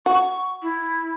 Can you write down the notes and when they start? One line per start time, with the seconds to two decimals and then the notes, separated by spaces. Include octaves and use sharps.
0.06 F#4 C#6
0.62 E4